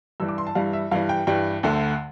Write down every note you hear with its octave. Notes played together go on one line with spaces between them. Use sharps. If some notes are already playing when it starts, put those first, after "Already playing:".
G2 E3 G3 E6
D6
C6
A5
G2 E3 G3 F5
E5
G2 E3 G3 F5
G5
G2 E3 G3 G5
D2 D3 A3